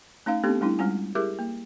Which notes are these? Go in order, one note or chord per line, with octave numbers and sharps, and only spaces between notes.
A3 C#4 D#4 F5
A3 B3 C4 D4 G4 A4
G3 A3 C#4 D4 E4
G3 G#3 C#4 F4 G#5
E4 G4 G#4 A#4 E5 D6
A#3